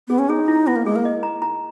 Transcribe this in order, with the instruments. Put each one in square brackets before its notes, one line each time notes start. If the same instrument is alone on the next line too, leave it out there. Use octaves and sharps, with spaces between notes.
[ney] B3 [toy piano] G#4
[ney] C#4
[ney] D#4 [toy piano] G#4
[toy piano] E4
[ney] B3 [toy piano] E4
[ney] A#3
[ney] G#3 [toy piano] G#4
[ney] A#3
[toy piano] D#5
A#5
A#5